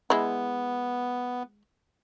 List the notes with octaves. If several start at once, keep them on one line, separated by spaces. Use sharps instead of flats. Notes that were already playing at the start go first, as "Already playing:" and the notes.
G#3 B3 E4